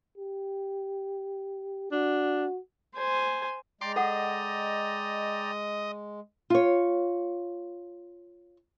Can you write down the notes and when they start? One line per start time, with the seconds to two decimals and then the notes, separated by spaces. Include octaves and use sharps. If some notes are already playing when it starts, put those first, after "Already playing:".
0.18 G4
1.92 D4 F#4
2.95 C5 G#5
3.81 G#3 D5 G5 A#5 C6 D6
3.96 A4 D#5 F#5
6.50 F4 C#5